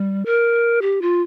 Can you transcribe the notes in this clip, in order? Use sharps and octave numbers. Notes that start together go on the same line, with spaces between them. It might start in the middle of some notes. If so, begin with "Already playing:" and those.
Already playing: G3
A#4
G4
F4